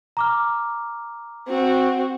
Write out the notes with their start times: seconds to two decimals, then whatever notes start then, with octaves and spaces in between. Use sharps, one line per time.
0.17 A#5 D6 F6
1.47 C4 F#4